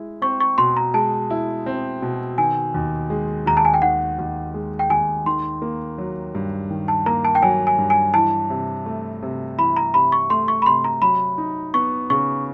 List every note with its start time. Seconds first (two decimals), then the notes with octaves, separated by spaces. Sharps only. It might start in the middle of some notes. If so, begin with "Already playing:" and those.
Already playing: G#3 E4
0.22 C4 C#6
0.40 C#6
0.58 B2 C6
0.77 A#5
0.94 G#3 A5
1.30 E4
1.66 C4
2.02 B2
2.38 D#3 G#5
2.74 D#2
3.10 G#3
3.46 D#2 A#5
3.57 A5
3.65 G#5
3.74 G5
3.82 D#3 F#5
4.19 D#2
4.54 G#3
4.79 G5
4.90 D#2 G#5
5.26 D#3 C6
5.62 A#3
5.98 F#3
6.35 G2
6.71 D#3
6.88 A5
7.06 A#3 A#5
7.25 A5
7.35 G5
7.42 F#3 G#5
7.67 G#5
7.78 G2
7.90 G#5
8.14 E3 A5
8.50 C3
8.86 A3
9.22 C3
9.58 E3 B5
9.76 A#5
9.94 C3 B5
10.12 C#6
10.30 A3 C6
10.48 C#6
10.62 B5
10.66 C3 C6
10.84 A#5
11.02 F#3 B5
11.38 D#4
11.74 B3 C#6
12.10 C#3 C#6